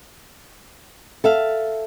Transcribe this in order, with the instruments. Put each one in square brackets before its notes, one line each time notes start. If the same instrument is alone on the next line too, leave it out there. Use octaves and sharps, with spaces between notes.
[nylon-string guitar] A4 E5 F5